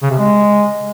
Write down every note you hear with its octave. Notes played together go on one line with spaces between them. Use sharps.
C#3
C3
G#3